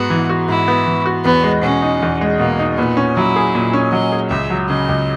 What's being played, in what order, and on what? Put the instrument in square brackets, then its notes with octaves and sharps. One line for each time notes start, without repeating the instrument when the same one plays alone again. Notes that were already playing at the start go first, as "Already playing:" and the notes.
Already playing: [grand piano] G#2 B3 [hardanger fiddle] F#4
[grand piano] E3
F#4
[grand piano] G#2 [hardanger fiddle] E4
[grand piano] B3
E3
F#4
[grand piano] E2 [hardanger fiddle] B3
[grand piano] G#3
[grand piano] B2 [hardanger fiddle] C#4
[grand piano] D#4
E2
G#3
[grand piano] B2 [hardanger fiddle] A#3
[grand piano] D#4
[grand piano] A#2 [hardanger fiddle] B3
[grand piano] C#4
[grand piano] F#3 [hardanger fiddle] E4
[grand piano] G#4
A#2
C#4
[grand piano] F#3 [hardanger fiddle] D#5
[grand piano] G#4
[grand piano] C#2 [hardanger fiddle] E5
[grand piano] F#3
[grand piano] C#3 [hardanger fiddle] D#5
[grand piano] C#2